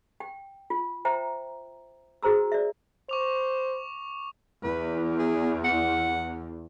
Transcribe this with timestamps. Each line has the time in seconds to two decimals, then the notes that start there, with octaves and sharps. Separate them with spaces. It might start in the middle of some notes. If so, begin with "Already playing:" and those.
0.20 G5
0.70 F4
1.05 C5 E5 G5 A#5
2.23 F#4 G#4 C5 A#5 E6
2.52 D5 E5
3.09 C5 C#6 D6 F7
4.64 E2 B4
5.19 G#4
5.65 F#5